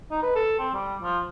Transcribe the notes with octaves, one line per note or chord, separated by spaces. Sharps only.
D#4
B4
A4
C4
G3
F3